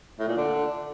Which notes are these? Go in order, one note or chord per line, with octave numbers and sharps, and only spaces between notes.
A2
A#2
D3